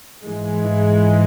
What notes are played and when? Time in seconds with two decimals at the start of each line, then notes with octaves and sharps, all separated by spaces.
0.24 G#2 E3 G#3